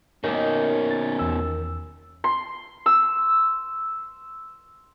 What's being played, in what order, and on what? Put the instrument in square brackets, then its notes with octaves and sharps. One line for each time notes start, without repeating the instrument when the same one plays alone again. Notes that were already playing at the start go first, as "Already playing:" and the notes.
[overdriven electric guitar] B2 C#4 [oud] D#3 A#3
[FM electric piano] A6
E2 E6
[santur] C6
E6